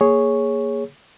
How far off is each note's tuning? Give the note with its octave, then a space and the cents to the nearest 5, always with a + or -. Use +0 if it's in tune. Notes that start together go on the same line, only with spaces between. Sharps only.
A#3 +0 G#4 +0 C#5 +0